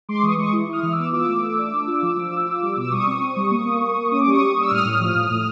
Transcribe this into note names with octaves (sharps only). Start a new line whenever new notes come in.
G#3 C6 D6
E3 C#6 D#6
G#3 C#6 D#6
E4
E4 D#6 F6
E3 D#6
D6 E6
B3
F4 D6 E6
A3
A3
D4
D4
F4
F3
F3
F4
F4
G3
B2 E6
G3 C#6 D#6
C4
C4
G3
A#3
A#3
A#3
A#3
C#4 D#6
D6
G3 C#6 D#6
G3
G3
E6
A2 D#6 F6
A2
F3
A2
A2